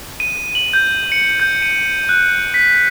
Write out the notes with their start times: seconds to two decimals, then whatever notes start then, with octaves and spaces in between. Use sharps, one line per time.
0.20 D#7
0.55 F#7
0.73 G6
1.12 C#7
1.40 G6
1.62 D#7
2.09 F#6
2.54 B6